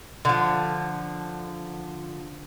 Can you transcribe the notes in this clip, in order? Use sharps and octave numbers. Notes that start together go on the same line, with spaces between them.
D3 F3